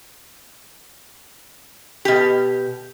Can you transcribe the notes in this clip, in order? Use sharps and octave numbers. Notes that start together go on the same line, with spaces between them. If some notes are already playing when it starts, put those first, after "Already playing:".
B2 G4